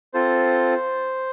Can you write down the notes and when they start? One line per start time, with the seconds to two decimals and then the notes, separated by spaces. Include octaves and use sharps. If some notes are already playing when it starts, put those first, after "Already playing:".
0.14 C4 F4 A4 C5